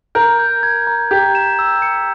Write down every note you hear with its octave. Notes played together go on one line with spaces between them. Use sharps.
A#4 G6
G6
G#6
A#5
G4 G6
E7
E6
C#7